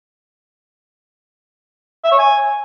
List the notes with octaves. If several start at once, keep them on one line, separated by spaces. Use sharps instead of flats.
E5
C#5
G#5